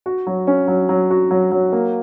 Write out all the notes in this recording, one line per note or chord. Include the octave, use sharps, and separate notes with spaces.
F#4
F#3
C#4
F#3
F#3
F#4
F#3
F#3
A#3